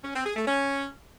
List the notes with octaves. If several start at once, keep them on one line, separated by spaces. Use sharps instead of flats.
C#4
C4
G#4
A3
C#4